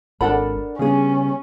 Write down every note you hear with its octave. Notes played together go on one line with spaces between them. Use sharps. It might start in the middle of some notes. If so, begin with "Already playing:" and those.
G#1 D4 A4 A#4 D5 F#5 B5
C#3 G3 B3 C#4 G#4